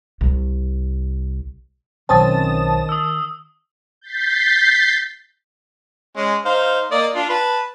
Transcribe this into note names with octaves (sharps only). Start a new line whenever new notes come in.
C2
B1 D#3 C4 C#4 A5 D#6 A6
D#6 E6
G6 A6 B6 C7
G#3 C#4
D#4 C5 F5
A#3 D5 D#5
D4 F4
B4 A5